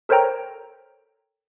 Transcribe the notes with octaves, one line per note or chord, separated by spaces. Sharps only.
A4 A#4 C5 C#5 G5 A#5